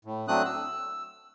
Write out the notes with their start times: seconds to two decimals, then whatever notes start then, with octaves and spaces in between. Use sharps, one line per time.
0.05 A2
0.28 F#3 A3 C4 D4 D#6 F#6
0.45 E6